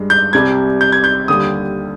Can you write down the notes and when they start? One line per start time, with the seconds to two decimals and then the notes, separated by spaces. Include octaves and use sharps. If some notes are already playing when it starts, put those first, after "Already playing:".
Already playing: G2 G#3
0.10 G6
0.33 C2 C3 G3 G#6
0.81 G6
0.92 G#6
1.04 G6
1.28 D#2 D3 G3 D#6